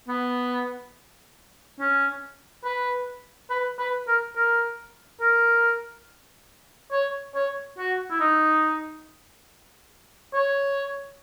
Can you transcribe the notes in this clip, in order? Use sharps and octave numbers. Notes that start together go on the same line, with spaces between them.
B3
C#4
B4
B4
B4
A#4
A#4
A#4
C#5
C#5
F#4
E4
D#4
C#5